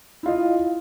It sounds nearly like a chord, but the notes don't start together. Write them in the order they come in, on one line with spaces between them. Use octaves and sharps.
E4 F4 D#5